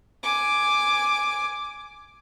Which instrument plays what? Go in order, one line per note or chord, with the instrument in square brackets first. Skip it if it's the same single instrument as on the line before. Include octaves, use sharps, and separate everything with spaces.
[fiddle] G#5 D6